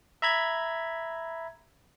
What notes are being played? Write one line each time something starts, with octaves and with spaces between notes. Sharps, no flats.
E5 A#5 B5 G#6